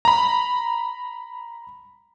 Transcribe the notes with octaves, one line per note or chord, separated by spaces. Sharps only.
A#5 B5